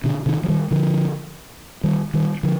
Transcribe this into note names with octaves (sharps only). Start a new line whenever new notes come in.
B2 D3
C3 D#3
F3
D#3 G3
D3 F3
D#3 G3
D#3 G3
D3 F3